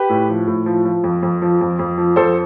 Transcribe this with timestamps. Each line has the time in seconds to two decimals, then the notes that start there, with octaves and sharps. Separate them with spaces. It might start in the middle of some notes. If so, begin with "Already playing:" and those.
Already playing: G4 B4
0.09 A2
0.29 F3
0.47 A2
0.66 F3
0.85 F3
1.04 F2
1.23 F2
1.42 F3
1.61 F2
1.79 F2
1.98 F3
2.16 F2 A4 C5